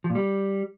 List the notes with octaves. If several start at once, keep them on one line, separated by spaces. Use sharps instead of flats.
F3
A#2
G3